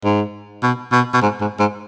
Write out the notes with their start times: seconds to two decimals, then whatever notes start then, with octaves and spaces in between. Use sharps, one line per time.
0.05 G#2
0.63 B2
0.92 B2
1.14 B2
1.22 G#2
1.41 G#2
1.60 G#2